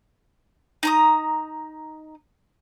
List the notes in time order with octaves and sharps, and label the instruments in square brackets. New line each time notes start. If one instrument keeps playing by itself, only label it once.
[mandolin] D#4 A#5 D#6